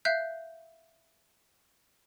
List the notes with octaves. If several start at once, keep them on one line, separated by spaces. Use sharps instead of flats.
E5 F5 F#6 G6 C7